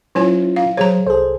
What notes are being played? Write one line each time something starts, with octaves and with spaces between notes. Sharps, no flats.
F#3 C#4 E4 F4 C#5 G#5
F5
F#3 G#4 C5 C#5 A#5
C2 G#4 A4 C5